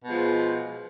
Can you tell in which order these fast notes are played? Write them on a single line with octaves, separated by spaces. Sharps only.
B2 G#3 F3